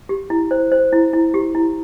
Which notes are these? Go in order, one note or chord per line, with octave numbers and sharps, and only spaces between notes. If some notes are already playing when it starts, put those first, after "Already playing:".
G4
E4
C5
C5
E4
E4
G4
E4